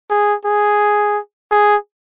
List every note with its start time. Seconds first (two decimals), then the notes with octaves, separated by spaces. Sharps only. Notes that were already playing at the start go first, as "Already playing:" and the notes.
0.10 G#4
0.45 G#4
1.51 G#4